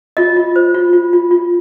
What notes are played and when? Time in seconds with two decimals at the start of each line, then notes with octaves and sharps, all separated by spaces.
0.17 F4 D#5
0.36 F4
0.56 C5
0.74 F4
0.93 F4
1.13 F4
1.31 F4